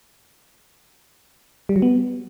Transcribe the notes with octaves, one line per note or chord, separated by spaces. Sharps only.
G3
F#3
B3